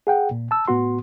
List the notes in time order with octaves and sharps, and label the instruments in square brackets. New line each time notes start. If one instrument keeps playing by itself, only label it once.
[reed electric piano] G#4 F#5 G5
A#2
A5 E6
A2 B3 F#4 C6